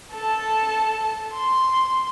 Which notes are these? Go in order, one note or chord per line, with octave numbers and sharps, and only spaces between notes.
A4 A5
C6